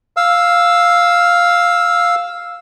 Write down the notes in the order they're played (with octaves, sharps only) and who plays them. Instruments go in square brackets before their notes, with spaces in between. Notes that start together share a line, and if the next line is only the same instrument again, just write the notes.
[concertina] F5 E6